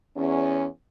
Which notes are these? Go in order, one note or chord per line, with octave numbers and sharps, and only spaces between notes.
E2 C#4